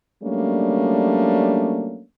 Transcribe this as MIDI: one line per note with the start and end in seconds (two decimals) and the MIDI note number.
0.23 2.02 54
0.23 2.02 55
0.23 2.02 57
0.23 2.02 58
0.23 2.02 61
0.23 2.02 62